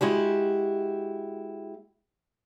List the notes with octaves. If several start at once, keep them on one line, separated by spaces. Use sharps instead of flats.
G#3 E4 F#4 G4